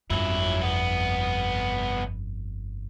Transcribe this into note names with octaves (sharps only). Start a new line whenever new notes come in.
G1 F2 F#3 E4
C2 B3